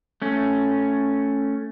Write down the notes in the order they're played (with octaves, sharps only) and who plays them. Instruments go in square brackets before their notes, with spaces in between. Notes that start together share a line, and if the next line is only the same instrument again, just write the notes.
[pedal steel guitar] A3 C#4